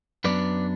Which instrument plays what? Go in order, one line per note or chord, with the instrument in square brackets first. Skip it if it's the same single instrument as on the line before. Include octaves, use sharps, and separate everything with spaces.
[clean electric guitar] F#2 F#3 B3 D4 B4 D5